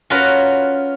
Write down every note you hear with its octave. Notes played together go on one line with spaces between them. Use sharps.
C#4 F4 F#4 A#4 B4